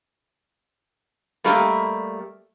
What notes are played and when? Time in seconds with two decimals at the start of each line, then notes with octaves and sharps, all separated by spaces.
1.44 G3 A3 A#3 G4 D#5 E5